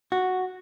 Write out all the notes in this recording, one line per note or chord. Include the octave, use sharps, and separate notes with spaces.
F#4